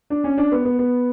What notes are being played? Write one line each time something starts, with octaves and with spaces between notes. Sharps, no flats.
D4
C#4
D4
B3
B3
B3